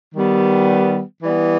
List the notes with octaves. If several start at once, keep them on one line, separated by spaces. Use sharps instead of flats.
D#3 G3 B3
E3 G3 B3